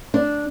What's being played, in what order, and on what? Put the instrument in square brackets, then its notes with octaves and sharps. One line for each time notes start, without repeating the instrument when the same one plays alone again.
[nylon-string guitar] D4